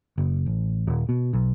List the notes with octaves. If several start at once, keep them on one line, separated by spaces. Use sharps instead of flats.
F#1
A1
D#1
B2
B1